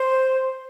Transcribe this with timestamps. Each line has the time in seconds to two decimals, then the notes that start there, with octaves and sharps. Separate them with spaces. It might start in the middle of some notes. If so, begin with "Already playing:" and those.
Already playing: C5